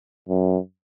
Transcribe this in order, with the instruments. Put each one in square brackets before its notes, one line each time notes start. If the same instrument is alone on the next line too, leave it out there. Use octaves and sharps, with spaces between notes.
[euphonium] F#2